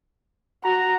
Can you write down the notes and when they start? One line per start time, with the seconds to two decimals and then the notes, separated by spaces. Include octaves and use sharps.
0.64 F#4 A#5